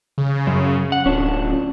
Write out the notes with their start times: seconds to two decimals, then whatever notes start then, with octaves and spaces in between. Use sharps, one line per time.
0.18 C#3
0.47 F#2
0.92 F#5
1.06 D1 C#4 D4 F4